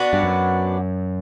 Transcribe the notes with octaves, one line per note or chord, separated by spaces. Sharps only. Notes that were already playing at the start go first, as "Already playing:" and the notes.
Already playing: B3 D4 F#4
G2
F#2